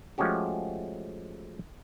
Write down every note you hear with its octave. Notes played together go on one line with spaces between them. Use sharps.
F3 G#3 A3 C#4 F#4 G4